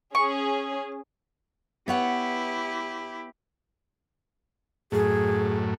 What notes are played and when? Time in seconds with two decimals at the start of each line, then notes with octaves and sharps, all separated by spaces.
0.15 C#4 G#4 C#6
1.88 B3 E4 G4 C#5 F#5
4.92 F#2 A2 G#4